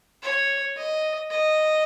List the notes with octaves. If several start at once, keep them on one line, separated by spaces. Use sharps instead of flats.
C#5
D#5
D#5